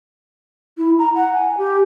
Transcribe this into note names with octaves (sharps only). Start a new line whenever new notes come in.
E4
A#5
F#5
G#5
G4